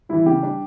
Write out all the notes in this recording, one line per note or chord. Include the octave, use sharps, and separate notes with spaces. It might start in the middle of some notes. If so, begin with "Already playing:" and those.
E3 G3 E4
C#3 G4
G3 D4